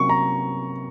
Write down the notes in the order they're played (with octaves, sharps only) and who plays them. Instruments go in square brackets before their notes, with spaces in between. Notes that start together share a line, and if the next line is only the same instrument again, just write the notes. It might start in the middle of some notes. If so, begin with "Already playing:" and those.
Already playing: [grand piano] C3 F#3 A#3 C#4 C#6
A#5